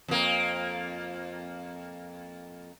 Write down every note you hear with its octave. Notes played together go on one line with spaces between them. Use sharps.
F2 A#3